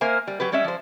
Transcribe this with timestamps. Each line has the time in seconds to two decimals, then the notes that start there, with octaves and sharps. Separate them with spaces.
0.01 A#3 A#4 C5 E5 G#5
0.27 G3
0.40 F#3 G4 B4
0.52 G3 G#3 C#4 D5 E5
0.64 F3 C5